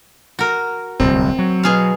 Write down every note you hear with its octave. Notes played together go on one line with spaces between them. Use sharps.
F#4 A#4
D1 C2 C4
F#3
B2 G#4 F5